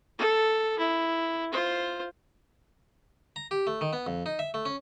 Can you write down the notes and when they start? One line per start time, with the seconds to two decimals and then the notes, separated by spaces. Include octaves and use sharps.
0.18 A4
0.78 E4
1.52 F4 C5
3.36 A#5
3.51 G4
3.67 A3
3.81 D#3
3.93 B3
4.06 F2
4.26 D#4
4.39 E5
4.54 A3
4.65 C#4